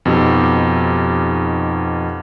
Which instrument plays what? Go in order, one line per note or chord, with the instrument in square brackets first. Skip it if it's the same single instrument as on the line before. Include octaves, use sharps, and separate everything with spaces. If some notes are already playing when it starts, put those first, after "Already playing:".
[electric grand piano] F2 B2 D#4 G4 E6